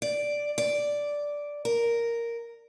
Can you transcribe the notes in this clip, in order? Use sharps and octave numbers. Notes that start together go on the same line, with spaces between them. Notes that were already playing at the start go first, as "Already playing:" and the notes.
D5
D5
A#4